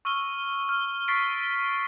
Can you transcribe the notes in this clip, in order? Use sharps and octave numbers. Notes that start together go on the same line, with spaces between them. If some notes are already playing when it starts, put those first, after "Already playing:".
C#6 E6 F6 D#7 G7
F6
C#6 A6 B6 C7 D7